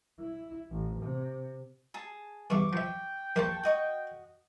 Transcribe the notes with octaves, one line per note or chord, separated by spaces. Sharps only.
E4
A1
C3
G#4 A5
E2 G2 C#6 D6
F3 E5 G5
A#1 A#3 A4 C5 A5 C#6
F#4 D#5 C#6